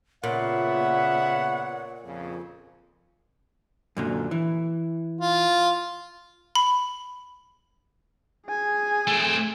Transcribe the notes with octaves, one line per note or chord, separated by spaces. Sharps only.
A#2 C#3 B3 C#5 E5 F#5
F2 C#3
F#2 A#2 D3
E3
F4
B5
G#4 G#5
A3 C4